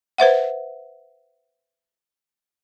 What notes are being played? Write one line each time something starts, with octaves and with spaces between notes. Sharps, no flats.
B4 C5 E5 F#5